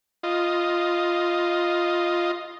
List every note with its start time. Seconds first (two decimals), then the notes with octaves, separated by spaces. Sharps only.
0.23 F4 D#5